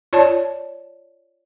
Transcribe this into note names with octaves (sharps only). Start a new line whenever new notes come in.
F4 C#5 D5 A5